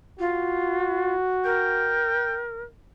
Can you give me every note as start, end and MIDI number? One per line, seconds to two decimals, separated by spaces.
0.19 1.14 65
0.19 2.11 66
1.45 2.62 70
1.45 2.39 79